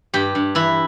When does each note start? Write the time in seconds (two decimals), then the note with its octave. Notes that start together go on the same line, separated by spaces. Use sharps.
0.14 G2 G4
0.35 G2
0.55 E3 E4